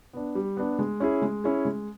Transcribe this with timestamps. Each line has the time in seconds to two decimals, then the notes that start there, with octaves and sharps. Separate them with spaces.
0.13 B3 D4
0.35 G3
0.57 B3 D4
0.79 G#3
1.00 C#4 E4 G#4
1.22 G#3
1.44 C#4 E4 G#4
1.65 G#3